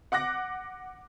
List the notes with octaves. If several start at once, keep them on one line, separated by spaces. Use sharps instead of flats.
F#5 D6 F#6 A#6